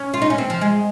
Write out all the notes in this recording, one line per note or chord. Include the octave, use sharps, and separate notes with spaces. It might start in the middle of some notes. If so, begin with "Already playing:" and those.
Already playing: C#4
F4
D#4
C#4
C4
F3
G#3